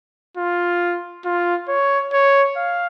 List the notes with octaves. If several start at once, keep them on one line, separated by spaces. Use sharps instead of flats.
F4
F4
C#5
C#5
F5